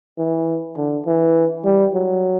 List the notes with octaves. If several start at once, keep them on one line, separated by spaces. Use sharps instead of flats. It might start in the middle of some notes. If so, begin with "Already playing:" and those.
E3
D3
E3
G3
F#3